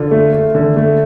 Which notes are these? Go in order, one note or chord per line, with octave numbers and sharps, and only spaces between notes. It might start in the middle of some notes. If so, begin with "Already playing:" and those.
Already playing: D3 F4
A3
A3
D3
A3